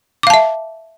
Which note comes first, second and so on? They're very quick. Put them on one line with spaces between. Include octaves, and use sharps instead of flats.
D6 F5 A5 E5